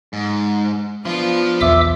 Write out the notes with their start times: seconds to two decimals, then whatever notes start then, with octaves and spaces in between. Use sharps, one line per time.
0.13 G#2
1.05 F3 B3 D4 F4
1.61 B1 E2 E5 D6 E6